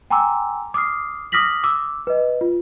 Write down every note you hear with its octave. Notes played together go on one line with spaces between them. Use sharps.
G5 G#5 A#5 C6 D6 E6
D6 D#6 F6 C7
D6 D#6 F6 A#6 B6 F#7
D6 E6
B4 D#5
F4